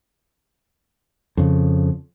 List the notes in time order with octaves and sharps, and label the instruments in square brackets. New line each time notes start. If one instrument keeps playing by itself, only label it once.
[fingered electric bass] F2 C#3